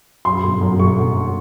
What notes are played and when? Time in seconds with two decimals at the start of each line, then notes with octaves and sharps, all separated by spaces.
0.25 F#2 C6
0.43 G1
0.61 F#2
0.79 G1 C#6
0.98 G1